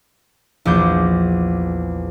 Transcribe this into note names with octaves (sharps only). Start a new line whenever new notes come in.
A#1 E2 D6 G6